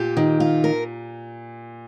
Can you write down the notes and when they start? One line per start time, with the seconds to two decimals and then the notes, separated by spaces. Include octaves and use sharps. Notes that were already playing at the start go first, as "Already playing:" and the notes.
Already playing: A#2 G4
0.17 D#3
0.40 F4
0.64 A#4